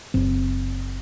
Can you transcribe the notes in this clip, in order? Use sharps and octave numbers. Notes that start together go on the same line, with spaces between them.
F#1 C4